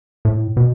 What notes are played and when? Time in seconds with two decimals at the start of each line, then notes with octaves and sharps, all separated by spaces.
0.25 A2
0.57 B2